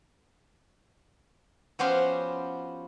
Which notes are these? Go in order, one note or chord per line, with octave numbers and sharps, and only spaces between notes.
F3 B3 C#4 F#4 G4 C5